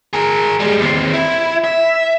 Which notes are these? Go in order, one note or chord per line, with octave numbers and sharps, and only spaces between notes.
G#4 A#4
G3 G#3
D#2 C4
E4
E5